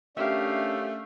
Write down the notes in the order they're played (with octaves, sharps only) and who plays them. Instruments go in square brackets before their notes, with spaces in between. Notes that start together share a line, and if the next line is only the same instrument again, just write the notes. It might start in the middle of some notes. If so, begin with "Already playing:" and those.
[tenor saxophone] A3 [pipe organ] C#4 D4 [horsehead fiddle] G4 F5 [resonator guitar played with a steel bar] A#4 E5